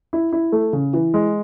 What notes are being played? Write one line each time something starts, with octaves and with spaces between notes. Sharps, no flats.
E4
E4
A3
C#3
E3
G#3